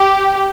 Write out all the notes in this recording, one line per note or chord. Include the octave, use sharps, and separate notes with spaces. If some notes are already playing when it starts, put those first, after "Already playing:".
Already playing: G4